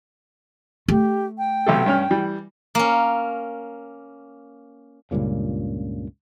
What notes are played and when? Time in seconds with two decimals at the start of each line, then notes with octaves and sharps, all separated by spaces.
0.88 A3 G4
1.38 G5
1.66 B1 C3 A4
1.86 G2 C#4 F6
2.10 E3 G3
2.75 A#3 C#4
5.11 C#2 G2 A#2 C#3